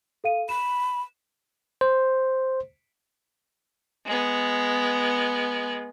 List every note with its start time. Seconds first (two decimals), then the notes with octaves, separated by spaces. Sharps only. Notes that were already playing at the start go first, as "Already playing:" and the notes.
0.24 A4 F5 D#7
0.49 B5 E7
1.81 C5
4.05 G#3 B3